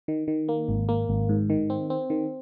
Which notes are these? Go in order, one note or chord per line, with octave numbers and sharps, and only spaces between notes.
D#3
D#3
A#3
G#1
A#3
G#1
G#2
D#3
C4
C4
D#3